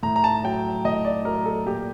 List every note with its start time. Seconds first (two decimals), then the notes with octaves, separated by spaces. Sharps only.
0.03 A2 A#5
0.16 A#5
0.24 A5
0.44 F#3 G5
0.85 A2 D#5
1.05 D5
1.25 F#3 A#4
1.46 A4
1.66 A#2 G4